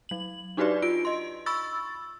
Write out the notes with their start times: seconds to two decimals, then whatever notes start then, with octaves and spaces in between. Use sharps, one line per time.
0.09 F#3 F#7
0.57 D4 D#4 F#4 G4 B4 D5
0.82 F4 D7
1.05 D#5 C6
1.46 B5 C#6 E6 A6